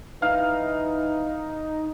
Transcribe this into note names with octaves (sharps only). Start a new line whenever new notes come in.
E3 D#4 F5 F6